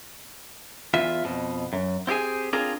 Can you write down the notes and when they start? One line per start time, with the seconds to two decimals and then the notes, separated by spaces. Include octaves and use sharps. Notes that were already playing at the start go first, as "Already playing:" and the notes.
0.94 E2 F4 E5
1.24 F2 B2
1.73 F#2
2.07 C4 E4 G4 G#4 G#5
2.53 C4 D4 F4 G#4 A#4